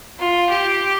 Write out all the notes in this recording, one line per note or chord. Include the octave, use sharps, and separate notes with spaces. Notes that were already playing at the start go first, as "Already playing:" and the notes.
F4
G4